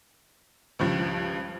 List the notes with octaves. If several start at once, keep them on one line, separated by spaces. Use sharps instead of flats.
C#2 G2 F3